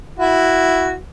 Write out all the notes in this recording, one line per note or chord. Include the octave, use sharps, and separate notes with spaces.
E4 F#4